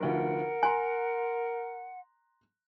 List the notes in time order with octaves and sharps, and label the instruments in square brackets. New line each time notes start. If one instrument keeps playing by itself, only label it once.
[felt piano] F1 D2 F3 [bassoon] A#4 [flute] F#5
[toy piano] G#5 [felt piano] A#5 C6 F#6